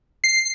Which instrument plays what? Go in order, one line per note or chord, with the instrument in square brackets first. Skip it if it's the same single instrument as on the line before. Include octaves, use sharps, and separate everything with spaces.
[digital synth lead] C7